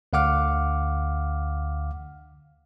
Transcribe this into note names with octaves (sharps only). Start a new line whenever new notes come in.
D2 D3 F5 F#5 D6 F6